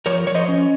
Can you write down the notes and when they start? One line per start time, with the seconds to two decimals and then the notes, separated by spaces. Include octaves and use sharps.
0.06 F3 A#4 C#5
0.27 F3 C#5
0.35 C5 D#5
0.49 C#4